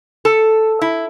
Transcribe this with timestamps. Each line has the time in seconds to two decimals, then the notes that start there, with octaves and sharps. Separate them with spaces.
0.25 A4
0.81 E4